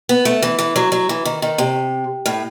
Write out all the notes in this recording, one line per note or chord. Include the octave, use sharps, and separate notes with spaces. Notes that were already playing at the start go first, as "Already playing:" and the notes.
B3
A3
E3
E3
F#3
F#3
E3
D#3
D#3
C3
A2